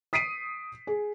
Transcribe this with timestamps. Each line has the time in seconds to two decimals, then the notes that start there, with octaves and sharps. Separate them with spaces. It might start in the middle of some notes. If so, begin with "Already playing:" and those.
0.13 D#6 B6 C7 D7 D#7
0.87 G#4